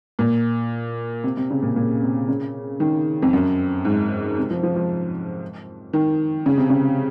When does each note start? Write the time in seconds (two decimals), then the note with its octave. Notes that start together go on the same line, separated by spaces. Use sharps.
0.19 A#2
1.24 C3
1.37 C3
1.50 C#3
1.62 A#2
1.76 A#2
2.02 C3
2.28 C#3
2.80 D#3
3.22 F2
3.33 F#2
3.85 G#2
4.37 C3
4.50 F3
4.63 F3
4.76 F3
5.93 D#3
6.46 C#3
6.57 C3
6.70 C#3